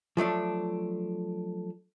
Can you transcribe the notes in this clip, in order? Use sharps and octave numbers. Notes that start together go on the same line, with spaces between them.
F3 F#3 A3 D4